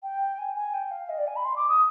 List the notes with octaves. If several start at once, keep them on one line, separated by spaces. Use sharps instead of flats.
G5
G#5
G#5
G5
F5
D#5
D5
G#5
B5
C6
D6
D#6